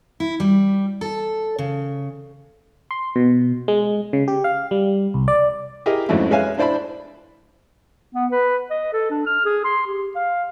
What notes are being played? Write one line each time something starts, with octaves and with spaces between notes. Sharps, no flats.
E4
G3
A4
C#3
C6
B2
G#3
C#3
G4
F5
G3
C2
D5
E4 G4 G#4 A#4 D#5
F2 G#2 F#3 A3 C#4 E4
G#3 B4 C#5 E5 F5 G#5
D4 E4 C5 D5 A5 B5
B3
B4
D#5
A4
D4
F6
G#4
C6
G4
F5